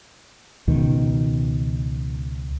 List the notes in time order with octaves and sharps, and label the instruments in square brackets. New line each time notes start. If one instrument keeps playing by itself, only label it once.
[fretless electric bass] C#2 B2 D#3